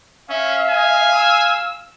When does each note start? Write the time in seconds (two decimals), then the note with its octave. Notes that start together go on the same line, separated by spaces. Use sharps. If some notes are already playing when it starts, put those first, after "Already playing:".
0.30 C#4 E5 F5
0.70 G#5
1.15 E6